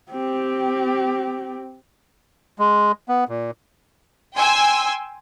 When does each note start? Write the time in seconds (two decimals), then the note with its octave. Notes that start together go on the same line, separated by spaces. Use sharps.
0.11 C4 G4
2.59 G#3
3.09 B3
3.29 A#2
4.36 G5 G#5 C6 E6